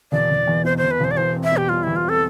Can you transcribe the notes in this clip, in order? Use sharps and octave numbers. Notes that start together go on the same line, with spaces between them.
E1 D5
E1
E2
B2 C5
E1 C5
B4
E1 C5
D5
E2 C5
C4
E5
B2
G4
G3 F4
E2 E4
F4
C4 A4